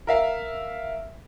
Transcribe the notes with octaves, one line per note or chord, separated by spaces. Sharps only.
A#4 E5 F5